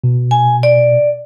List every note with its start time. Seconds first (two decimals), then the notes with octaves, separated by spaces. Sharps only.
0.04 B2
0.31 G#5
0.63 D5